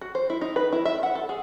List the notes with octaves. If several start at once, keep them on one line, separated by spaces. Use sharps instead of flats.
F#4
C5
E4
D#4
B4
E4
E5
F#5
A4
G#4